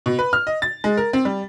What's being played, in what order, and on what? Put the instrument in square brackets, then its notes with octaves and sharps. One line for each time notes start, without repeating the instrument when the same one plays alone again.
[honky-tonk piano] B2
B4
F6
D#5
A6
G#3
A#4
C4
G3